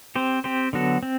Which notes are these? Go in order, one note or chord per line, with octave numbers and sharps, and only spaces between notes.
C4 G4 C5
C4 G4 C5
D3 F#3 B3 F#4 A4
C4